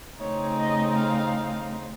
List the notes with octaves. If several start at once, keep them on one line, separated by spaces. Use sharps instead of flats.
C#3 A3 C4 D#4 C#5
D#5
F5